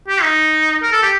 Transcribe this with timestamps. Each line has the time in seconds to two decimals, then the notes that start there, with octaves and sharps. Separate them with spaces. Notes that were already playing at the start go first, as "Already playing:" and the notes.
0.08 G4
0.22 D#4
0.82 A#4
0.92 A4
1.03 G4